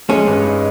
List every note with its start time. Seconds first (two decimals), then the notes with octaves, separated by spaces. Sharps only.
0.10 G#3 C#4
0.27 G2
0.45 D#4